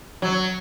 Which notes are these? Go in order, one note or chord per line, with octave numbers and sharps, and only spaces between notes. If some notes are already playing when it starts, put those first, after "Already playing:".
F#3